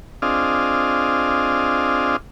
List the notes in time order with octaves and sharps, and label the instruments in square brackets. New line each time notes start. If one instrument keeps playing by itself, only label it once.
[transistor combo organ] C4 D4 F4 G#4 D#5 F5